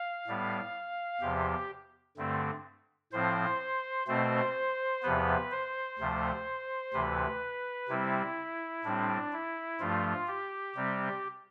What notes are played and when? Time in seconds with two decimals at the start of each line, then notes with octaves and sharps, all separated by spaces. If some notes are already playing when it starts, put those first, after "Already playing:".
Already playing: F5
0.27 A2 G3 B3
1.21 E2 C3 F3 G4
2.17 G2 D3 A3 C4
3.12 A2 F3 C4 C5
4.07 B2 A3 C4 C5
5.03 E2 C3 F3 B3 B4
5.51 C5
5.99 D2 C3 F3 A3
6.94 D2 C3 E3 B4
7.89 C3 G3 C4 E4
8.84 A2 G3 C4 D4
9.33 E4
9.80 G2 F3 A3 F4
10.28 G4
10.76 C3 G3 C4